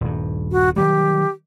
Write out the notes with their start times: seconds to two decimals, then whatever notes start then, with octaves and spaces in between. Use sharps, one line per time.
0.01 D#1 G2
0.52 F#4
0.76 D#3 F#3 G3 G4